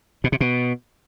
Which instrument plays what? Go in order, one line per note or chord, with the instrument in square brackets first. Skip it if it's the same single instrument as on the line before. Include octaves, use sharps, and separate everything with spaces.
[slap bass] B2
C3
B2